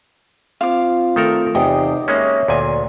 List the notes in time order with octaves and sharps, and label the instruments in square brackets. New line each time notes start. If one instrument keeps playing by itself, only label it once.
[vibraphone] C4 F4 C5 [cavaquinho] F5 D6
[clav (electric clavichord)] D#3 A4 A#4 [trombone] A3
[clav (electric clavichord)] E2 [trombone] C3 [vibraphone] D#4 C5 [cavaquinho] G4 D#5
[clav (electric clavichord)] G#3 A#3 C#4 [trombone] C#5 [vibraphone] E5
[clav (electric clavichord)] D2 A#2 G#5 [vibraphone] D5